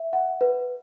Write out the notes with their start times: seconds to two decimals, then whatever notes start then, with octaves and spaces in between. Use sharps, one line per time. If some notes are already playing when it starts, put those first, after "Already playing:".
Already playing: E5
0.13 F#5
0.41 B4